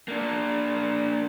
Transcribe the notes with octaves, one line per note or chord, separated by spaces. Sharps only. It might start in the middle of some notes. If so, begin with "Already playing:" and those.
A#3 D4